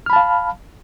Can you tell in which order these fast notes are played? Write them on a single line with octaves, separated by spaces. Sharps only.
F6 B5 A5 F5